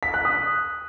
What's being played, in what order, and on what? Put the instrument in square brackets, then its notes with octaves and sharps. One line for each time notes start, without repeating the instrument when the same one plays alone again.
[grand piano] B6
F#6
D#6